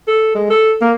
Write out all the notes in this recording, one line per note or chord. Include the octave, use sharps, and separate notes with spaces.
A4
G#3
A4
A#3